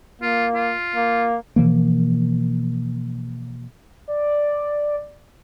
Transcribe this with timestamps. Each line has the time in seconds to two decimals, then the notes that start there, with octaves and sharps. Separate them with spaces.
0.22 A#3 F4
0.54 F4
0.96 A#3
1.56 B2 E3 F3 A#3
4.08 D5